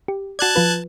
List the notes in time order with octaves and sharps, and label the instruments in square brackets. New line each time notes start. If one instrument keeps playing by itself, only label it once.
[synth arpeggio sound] G4
[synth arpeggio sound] F#4 D5 [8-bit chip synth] A5 F#6 G#6
[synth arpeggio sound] F3 F4 B4